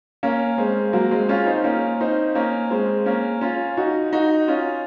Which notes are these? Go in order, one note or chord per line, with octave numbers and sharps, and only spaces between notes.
A#3 C#4
G#3 C4
F#3 A#3
G#3 C4
C#4 F4
C4 D#4
A#3 C#4
C4 D#4
A#3 C#4
G#3 C4
A#3 C#4
C#4 F4
D#4 F#4
D#4 F#4
C#4 F4